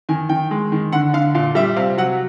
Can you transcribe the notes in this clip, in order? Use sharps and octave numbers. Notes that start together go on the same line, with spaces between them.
D#3 G#5
D#3 G5
G#3
D#3
D3 F#5
D3 F5
A#2 F5
G3 E5
C3 F5
F#3 F#5